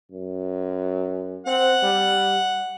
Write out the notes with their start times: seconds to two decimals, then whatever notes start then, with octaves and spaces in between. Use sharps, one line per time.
0.11 F#2
1.47 C4 F#5
1.83 G3